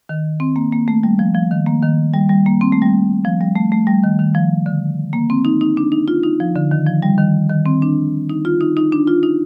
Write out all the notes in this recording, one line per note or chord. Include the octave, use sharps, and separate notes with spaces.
D#3
C4
A#3
A#3
A3
G3
F3
F3
D#3
A#3
D#3
G3
G3
A#3
C4
A3
G3
F3
G3
A3
A3
G3
D#3
D#3
F3
D3
A#3
C4
D#4
D#4
D4
D#4
F4
D#4
F3
D3
D#3
F3
G3
D#3
D#3
C4
D4
D#4
F4
D#4
D#4
D4
F4
D#4